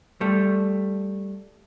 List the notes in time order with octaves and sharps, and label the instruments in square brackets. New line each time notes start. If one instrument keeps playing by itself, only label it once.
[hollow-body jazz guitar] G3 A3